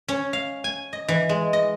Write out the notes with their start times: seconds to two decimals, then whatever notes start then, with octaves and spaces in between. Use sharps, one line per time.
0.08 C#4
0.33 F5
0.64 G#5
0.93 D#5
1.08 E3
1.29 G#3
1.53 D#5